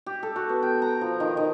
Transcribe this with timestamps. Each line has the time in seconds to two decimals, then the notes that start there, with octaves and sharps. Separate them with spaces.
0.06 G4
0.23 A4
0.36 F#4
0.49 B3
0.62 G5
0.82 A#5
1.01 F3
1.20 D#3
1.37 D#3